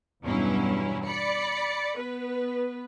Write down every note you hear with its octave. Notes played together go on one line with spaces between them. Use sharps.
E2 G2 B2 F#3 C#4 E4
D5 B5 C#7
B3 B4